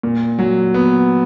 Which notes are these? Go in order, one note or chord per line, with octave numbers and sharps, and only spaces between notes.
A#2
F#3
B3